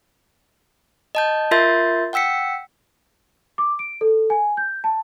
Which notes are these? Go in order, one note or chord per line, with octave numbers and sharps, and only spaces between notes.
D#5 A5 G6
F4 A#4 E5 C6 G6 A6
F#5 G5 E6 B6 C#7
D6
D7
A4
G#5
G6
A5